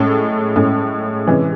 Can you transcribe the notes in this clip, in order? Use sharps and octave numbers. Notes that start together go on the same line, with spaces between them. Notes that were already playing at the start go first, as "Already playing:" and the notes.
Already playing: A2 G#3 C#4 A4
A2 G#3 C#4
C3 E3 G#3 C#4